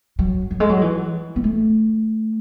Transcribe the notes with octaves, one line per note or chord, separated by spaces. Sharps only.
F#3
F#3
G#3
F#3
E3
B3
A3